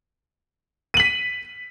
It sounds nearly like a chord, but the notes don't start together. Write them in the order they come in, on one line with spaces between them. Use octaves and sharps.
D#7 F#7 B6